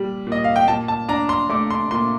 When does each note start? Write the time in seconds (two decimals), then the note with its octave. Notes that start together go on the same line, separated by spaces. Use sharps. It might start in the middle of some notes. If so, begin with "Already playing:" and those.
Already playing: A#2 G3
0.27 A#2
0.32 D#5
0.44 F5
0.56 G5
0.68 A#2 A5
0.88 A5
1.08 D4 A#5
1.29 C6
1.50 A3 D6
1.71 C6
1.91 A#2 C6